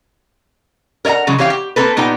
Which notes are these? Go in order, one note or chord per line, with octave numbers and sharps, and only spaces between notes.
A#4 C#5 D#5 F#5 A#5
C#3 E3 F#3 G#3
E3 G4 C#5 F5 G5
G4
A#3 C4 A4 B4
A#2 B3 D#4 G4 G5